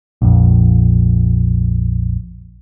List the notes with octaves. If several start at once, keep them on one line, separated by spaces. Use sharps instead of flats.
A#1 F2